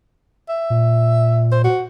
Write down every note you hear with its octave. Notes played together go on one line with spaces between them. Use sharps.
E5
A#2
C5
F#4